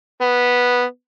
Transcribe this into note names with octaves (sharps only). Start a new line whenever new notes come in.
B3